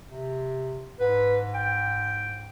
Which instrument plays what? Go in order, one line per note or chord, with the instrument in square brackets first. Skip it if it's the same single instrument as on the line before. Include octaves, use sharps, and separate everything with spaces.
[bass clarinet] C3
[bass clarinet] G#2 [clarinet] B4
[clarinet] G5